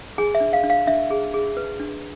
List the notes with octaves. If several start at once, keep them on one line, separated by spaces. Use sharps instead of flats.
G#4 G#5
E5
D4
F5
D4
F5
D4 E5
G#4
G#4
B4
D4